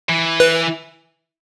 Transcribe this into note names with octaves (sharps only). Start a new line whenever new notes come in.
E3
B4